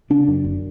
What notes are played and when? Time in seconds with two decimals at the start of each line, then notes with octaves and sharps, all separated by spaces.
0.10 C#3 D4
0.28 F#2
0.44 F#1